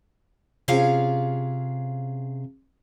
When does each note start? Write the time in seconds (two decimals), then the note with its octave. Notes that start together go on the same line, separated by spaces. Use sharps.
0.68 C3 C#4 F4 G#4 F5